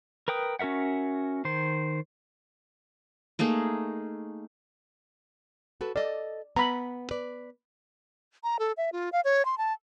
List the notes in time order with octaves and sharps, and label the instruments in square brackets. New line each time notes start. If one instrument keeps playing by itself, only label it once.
[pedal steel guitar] A#4 B4 G5 D#6
C#4 F#4 A#4 E5 F#5
D#3 C5
[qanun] A3 A#3 D#4 G#4
[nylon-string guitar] F#4 A4 B4
[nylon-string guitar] A4 D#5 [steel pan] D5
[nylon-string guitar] B3 [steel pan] A#5 B5
[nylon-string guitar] B4 D5
[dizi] A#5
A4
E5
F4
F5
C#5
C6
A5